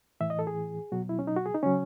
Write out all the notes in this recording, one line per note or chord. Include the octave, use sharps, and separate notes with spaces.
A2 E3 E5
D#5
A4
G#4
B2 F#3 F#4
E4
C#4
D#4
F#4
G#4
D#4
C#3 F#3 C#4